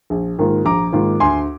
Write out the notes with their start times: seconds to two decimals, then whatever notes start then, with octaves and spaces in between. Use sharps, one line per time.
0.10 A#1
0.39 G#2 D#3 A#3 F4
0.65 A#1 A#5 D6
0.93 G#2 D#3 A#3 F4
1.20 D2 G#5 C6